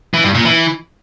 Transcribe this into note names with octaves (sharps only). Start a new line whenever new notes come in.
E3
G2
A#2
E3